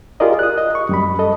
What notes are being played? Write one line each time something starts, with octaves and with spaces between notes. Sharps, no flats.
F4 G4 G#4 A#4 D5 D#5
D#6 F#6
D#5
C#6
F#2 G3 B5
A4 D#5